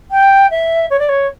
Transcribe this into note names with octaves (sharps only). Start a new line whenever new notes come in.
G5
E5
C#5
D5
C#5